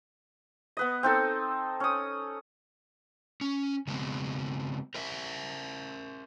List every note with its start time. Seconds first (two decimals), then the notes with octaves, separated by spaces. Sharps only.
0.77 B3 B4 D#5
1.03 C4 D#4 A4
1.80 C#4 D#6
3.41 C#4
3.87 C#3 G#3 B3 C4
4.95 A#4 C5 E5